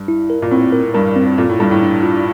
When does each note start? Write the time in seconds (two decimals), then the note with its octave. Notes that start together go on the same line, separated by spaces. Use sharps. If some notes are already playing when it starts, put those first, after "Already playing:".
Already playing: G2
0.08 E4
0.30 A#4
0.42 A#2
0.51 A2 C4
0.72 A#4
0.94 G2 A#4
1.16 C4
1.38 A#2 A4
1.49 A2
1.59 G2 A4
1.71 A2
1.82 D4
2.03 F4